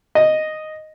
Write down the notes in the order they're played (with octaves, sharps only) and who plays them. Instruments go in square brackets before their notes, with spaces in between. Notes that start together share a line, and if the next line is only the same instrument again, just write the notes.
[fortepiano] D#5